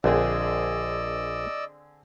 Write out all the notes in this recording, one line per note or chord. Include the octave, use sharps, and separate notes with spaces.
A#1 D3 C4 G#4 D5 D#5 E6